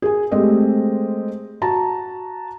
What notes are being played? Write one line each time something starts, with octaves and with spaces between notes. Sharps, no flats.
G#4 G#5
G#3 A3 C4 G4 C5 D#5
F#4 A5 A#5